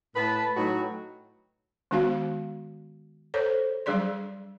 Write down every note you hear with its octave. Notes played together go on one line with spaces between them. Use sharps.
A2 B4 A5
A2 F#3 D#4 F#4 B4 G5
D#3 G#3 B3 D4 F#4 F5
A4 C5 C#5
F#3 G3 D4 G#4 D5 C6